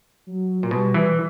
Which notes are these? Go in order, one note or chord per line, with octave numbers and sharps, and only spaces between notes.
F#3
A#2
B2 G3
E3